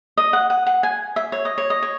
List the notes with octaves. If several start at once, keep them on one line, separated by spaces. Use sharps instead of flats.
D#5
F#5
F#5
F#5
G#5
E5
C#5
D#5
C#5
D#5
C#5